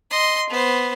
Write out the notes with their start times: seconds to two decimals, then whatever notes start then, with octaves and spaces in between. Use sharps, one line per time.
0.10 D#5 C6
0.49 B3 C5